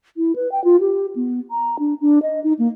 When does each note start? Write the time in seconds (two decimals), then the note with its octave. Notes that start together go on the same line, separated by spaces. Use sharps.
0.17 E4
0.36 B4
0.52 G5
0.64 F4
0.80 G4
1.15 B3
1.51 A#5
1.79 D4
2.01 D4
2.23 D#5
2.44 D#4
2.59 A#3